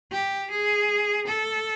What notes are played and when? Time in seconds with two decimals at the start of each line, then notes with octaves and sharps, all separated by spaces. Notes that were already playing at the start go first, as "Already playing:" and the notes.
0.12 G4
0.51 G#4
1.27 A4